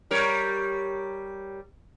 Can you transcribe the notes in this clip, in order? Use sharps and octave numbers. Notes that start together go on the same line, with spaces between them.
G3 A#4 C#5